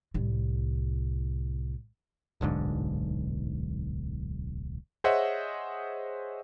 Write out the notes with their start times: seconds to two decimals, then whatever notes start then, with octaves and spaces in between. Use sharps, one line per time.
0.14 C2 A2
2.41 D1 B1 G#2 D3
5.04 G#4 C5 C#5 D#5 E5 F#5